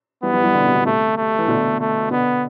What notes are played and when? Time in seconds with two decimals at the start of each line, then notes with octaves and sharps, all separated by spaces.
0.23 E3 G3 B3
0.33 E3 G3
0.44 E3 G3
0.54 B2 D3
0.65 C3
0.75 B2
0.85 C3 A3
1.17 A3
1.39 E3
1.48 B2 D3
1.80 A3
2.11 B2 D3 B3